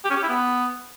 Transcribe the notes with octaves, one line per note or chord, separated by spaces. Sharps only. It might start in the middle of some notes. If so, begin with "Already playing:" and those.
G4
C#4
G4
E4
B3